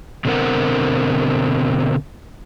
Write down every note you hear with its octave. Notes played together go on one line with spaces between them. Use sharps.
B2 D3 F#3 C4 A#4 F#5